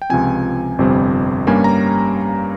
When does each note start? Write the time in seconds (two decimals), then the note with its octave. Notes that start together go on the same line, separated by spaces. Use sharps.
0.02 G5
0.10 C#2 C3 F3 C4 G#5
0.78 G1 F2 C3 G3 C4
1.47 G2 G3 A#3 C#4 G#5
1.64 A#5